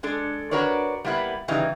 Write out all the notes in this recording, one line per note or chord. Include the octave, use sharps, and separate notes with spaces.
G#3 D4 A4
D4 F#4 A#4 B4 C#5 D5
G3 A#3 B3 E4 B4
C#3 E3 G3 D#4